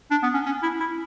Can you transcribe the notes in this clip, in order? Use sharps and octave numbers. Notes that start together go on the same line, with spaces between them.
D4
B3
C#4
C#4
E4
E4